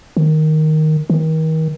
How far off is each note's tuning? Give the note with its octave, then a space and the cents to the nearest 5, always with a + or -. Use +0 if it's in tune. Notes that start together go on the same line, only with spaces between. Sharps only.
D#3 +0
D#3 +35